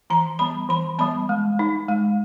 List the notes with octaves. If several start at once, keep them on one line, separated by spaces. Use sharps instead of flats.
E3 A#5
G3 B3 B5
E3 B5
G3 B3 B5
G#3
D#4
G#3